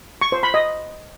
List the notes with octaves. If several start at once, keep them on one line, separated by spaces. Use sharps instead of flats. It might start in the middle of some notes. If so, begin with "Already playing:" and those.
C#6
C5
B5
D#5